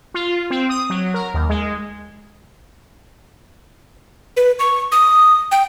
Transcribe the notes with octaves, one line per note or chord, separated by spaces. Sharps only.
F4
C4
D#6
F#3
A#4
D#2
G#3
B4
C#6
D#6
G5